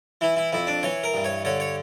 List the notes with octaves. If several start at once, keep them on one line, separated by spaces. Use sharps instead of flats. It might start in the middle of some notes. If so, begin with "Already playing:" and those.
E3 E4
E4
F2 E4
D4
E3 C#5
A#4
G2
C#5
D3 C#5
C#5